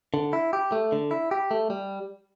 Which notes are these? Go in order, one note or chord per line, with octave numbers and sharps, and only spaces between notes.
D3
E4
G4
A3
D3
E4
G4
A3
G3